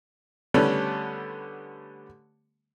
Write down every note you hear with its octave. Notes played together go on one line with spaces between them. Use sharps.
D3 G3 A3 B3 C#4